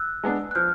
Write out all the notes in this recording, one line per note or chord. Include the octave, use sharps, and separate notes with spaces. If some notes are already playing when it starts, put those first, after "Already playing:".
Already playing: E6 F#6
G#3 B3 D4
F#6
F3 F6 G6